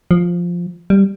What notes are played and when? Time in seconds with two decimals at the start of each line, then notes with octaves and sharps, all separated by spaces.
0.11 F3
0.90 G3